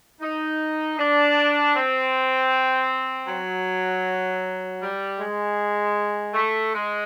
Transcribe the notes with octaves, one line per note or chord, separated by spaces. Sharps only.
D#4
D4
C4
F#3
G3
G#3
A3
G#3